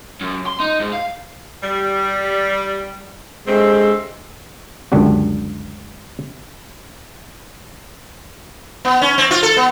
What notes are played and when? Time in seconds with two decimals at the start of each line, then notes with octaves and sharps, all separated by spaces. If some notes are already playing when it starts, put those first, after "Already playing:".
0.21 F#2
0.46 C6
0.60 D#4
0.80 G#2
0.92 F5
1.62 G3
3.47 G2 G#3 A3 C4
4.92 C#2 F#2 D3 G3 D4 F#4
8.85 B3
9.01 C#4
9.18 C4
9.31 F4
9.43 A4
9.57 B3